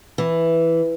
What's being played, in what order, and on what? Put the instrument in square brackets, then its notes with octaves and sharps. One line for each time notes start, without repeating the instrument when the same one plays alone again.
[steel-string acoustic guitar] E3